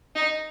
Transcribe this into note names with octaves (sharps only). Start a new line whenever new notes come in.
D#4